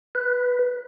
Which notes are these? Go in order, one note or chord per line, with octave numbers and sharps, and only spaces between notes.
B4